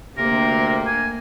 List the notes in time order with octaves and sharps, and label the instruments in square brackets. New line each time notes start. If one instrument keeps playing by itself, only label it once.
[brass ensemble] D2 C3 [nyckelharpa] A#3 [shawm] A#4
[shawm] G#5